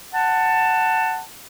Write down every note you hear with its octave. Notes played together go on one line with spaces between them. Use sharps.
F#5 A5